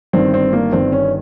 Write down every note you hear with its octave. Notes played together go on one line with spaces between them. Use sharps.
G1 G2 D#3 C4
C4
A#3
G1 G2 D#3 C4
C#4